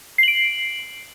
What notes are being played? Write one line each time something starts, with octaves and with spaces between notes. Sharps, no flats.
C7 D7 F#7